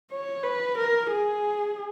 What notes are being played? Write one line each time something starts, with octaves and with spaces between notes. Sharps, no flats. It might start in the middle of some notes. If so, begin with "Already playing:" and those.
C#5
B4
A#4
G#4